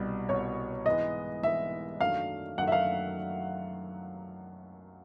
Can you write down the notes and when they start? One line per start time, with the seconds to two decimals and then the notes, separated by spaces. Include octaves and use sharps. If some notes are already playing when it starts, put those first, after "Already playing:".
Already playing: C2 B2 G3
0.29 C2 B2 G3 C#5
0.86 G#2 E3 G#3 B3 D#5
1.43 G#2 E3 G#3 B3 E5
2.01 F#2 D#3 F#3 A3 D4 F5
2.58 F#2 D#3 F#3 A3 D4 F#5
2.67 E5
2.72 F5